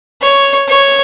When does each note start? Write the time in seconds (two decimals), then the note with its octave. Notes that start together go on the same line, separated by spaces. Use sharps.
0.22 C#5
0.68 C#5